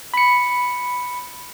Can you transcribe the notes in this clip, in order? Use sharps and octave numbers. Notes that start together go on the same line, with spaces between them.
B5 C#7